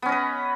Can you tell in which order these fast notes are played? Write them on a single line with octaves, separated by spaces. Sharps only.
B3 C#4 D#5 B4